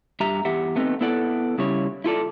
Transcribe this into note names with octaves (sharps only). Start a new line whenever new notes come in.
G2 G4 E5 A#5
E2 G4 E5 F#5
A3 B3 C4 D#4
B3 E4 A4 D5 F#5
C#3 G3 E4 C#5
E4 F4 A4 D5